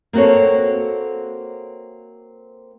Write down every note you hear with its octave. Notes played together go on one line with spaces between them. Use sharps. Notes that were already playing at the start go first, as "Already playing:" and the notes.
A#3 C4 F#4 A4 C#5